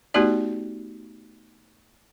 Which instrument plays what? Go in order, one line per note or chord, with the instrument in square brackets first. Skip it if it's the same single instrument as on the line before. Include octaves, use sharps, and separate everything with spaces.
[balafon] A3 B3 D#4 F#4 G4 D5